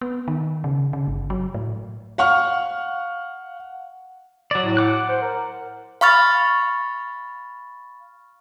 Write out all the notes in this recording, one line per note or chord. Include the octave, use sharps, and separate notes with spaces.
B3
D#3
C#3
C#3
G1
F#3
A2
F5 F#5 C#6 F6
F#3 D5
A2
F#5 D6 F#6
C5
A#4
F5 B5 C#6 F6 A6